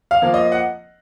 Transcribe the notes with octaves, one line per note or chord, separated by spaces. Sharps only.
F5
F3 A#3
D#5
F#5